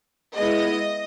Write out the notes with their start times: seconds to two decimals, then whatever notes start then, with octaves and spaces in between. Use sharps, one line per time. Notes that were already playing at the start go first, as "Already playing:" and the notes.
0.35 G#3 B3 E4 D#5